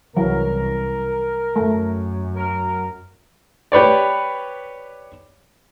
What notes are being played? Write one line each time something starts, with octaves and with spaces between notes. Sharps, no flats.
C2 E3 F#3 A#4
F#2 A3
F#3 A#4
G4 B4 C#5 D5